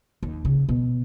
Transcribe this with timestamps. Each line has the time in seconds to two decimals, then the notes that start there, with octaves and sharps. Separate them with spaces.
0.23 D#2
0.45 C#3
0.69 B2